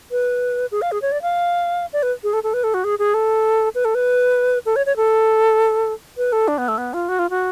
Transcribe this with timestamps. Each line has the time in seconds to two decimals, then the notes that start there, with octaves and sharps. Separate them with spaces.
0.11 B4
0.72 G#4
0.82 F5
0.92 G#4
1.02 C#5
1.12 D5
1.22 F5
1.93 D5
2.03 B4
2.24 G#4
2.33 A4
2.43 A4
2.54 B4
2.64 A4
2.74 F#4
2.84 G#4
2.99 G#4
3.14 A4
3.75 B4
3.85 A4
3.95 B4
4.66 A4
4.76 C#5
4.86 C#5
4.96 A4
6.17 B4
6.32 A4
6.48 D4
6.58 B3
6.68 A3
6.78 B3
6.94 F4
7.09 F#4
7.19 F4
7.30 F#4